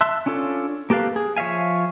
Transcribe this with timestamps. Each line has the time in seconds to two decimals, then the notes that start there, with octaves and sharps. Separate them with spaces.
0.01 E5 A5 C6 E6 F#6
0.26 C#4 D4 F4 A4 C#5
0.90 A#3 G4 A4 B4 F5
1.16 G#4
1.36 F3 C#5 E5 F5 G#5